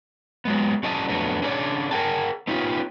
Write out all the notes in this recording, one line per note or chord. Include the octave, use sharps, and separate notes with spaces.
F#3 G#3 B3
F#3 C#4 G#4 D5 D#5 A5
F2 F#3 A3 B3 D4
C#4 D4 G#4 A#4 C#5 D5
G#4 A#4 F#5 G5 A5
B3 C#4 D#4 F4 G4